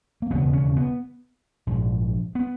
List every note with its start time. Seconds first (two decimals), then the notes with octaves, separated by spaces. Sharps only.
0.22 A#3
0.30 E1 D#2 C#3 B3
0.53 C#4
0.76 B3
1.67 A#1 G#2
2.35 B3